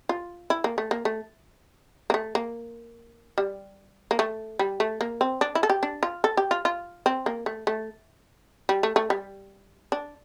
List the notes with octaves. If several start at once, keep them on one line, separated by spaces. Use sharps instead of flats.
F4
E4
A#3
A3
A#3
A3
A#3
A3
A#3
G3
A#3
A3
G3
A3
A#3
C4
D4
E4
A4
G4
D4
F4
A4
G4
F4
F4
C4
A#3
A3
A3
G3
A3
A3
G3
D4